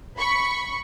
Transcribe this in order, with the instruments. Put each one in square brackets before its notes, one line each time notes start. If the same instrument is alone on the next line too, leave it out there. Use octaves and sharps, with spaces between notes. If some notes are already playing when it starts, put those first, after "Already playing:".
[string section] B5 C#6